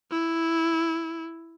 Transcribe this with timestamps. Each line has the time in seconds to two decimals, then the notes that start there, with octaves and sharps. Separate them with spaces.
0.11 E4